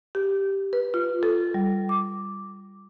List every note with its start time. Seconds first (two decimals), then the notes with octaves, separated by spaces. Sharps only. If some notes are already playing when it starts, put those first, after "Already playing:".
0.15 G4
0.73 B4
0.94 F4
1.23 A4
1.54 G3
1.89 D6